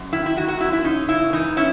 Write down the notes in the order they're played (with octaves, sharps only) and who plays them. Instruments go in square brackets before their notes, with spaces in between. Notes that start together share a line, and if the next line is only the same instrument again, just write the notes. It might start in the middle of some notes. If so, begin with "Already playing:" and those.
Already playing: [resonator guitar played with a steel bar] F#2
D#3 E4
E4
D#3 F#4
F#4
F#2 E4
E4
C#4 D#4
C#3 E4
E3 D#4
C#4 E4